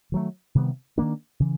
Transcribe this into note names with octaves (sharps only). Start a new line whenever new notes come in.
D#3 F#3 A3
C3 D#3 G3 B3
D#3 F#3 A#3 D4
C#3 E3